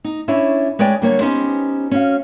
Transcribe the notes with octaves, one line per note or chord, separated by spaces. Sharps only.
D#4
C#4 D4 E4 C#5
G#3 B4 C#5 D5 G5
D3 G3 A#3 A4 C#5
B3 C#4 D#4 G4 C5
C#4 F#4 F5